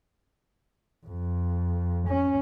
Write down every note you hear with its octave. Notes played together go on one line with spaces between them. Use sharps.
F2
C#4